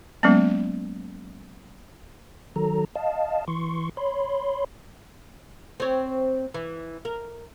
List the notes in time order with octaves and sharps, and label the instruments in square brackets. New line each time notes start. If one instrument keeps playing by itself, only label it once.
[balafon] F#3 G#3 A#3 B3 C#4
[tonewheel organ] D#3 F#3 A4 A#5
D#5 F5 A5
E3 C6 C#6
C#5 B5 C6
[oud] C4 C#5
E3
A#4